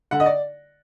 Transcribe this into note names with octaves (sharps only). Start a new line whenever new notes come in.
D3 F#5
D#5
D5